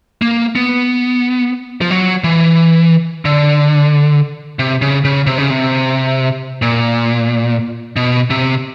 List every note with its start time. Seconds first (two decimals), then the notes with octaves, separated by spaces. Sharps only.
0.22 A#3
0.56 B3
1.81 F3
1.90 F#3
2.24 E3
3.25 D3
4.59 C3
4.82 C#3
5.05 C#3
5.27 C3
5.38 C#3
5.50 C3
6.62 A#2
7.96 B2
8.30 C3